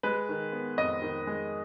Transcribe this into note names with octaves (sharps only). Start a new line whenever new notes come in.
G#3 B4
D#3
B3
F2 D#5
D#3
G#3